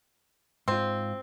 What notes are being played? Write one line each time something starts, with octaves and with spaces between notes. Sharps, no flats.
G#2 C4 F4